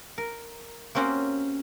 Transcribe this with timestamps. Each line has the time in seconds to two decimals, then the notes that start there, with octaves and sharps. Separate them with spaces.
0.18 A#4
0.95 A#3 C4 C#4 F#4 G4 C5